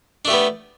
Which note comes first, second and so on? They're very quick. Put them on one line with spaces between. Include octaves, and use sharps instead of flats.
D4 A3 G4 B3